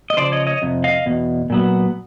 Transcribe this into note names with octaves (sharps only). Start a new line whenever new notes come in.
D#5
C#3 F3 C5 D5
C#5 D#5
C#5 D#5
F2 C3
D#5 F5
E2 B2
A#2 F#3 B3